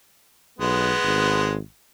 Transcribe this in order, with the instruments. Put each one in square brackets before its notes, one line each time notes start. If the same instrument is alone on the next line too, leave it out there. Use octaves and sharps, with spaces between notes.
[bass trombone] B1 [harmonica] G#3 B3
[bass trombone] G#1